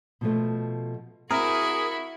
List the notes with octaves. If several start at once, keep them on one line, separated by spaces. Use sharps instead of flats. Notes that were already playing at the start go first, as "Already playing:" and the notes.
B2 F3 A3
C4 E4 F#4 G#4 A#4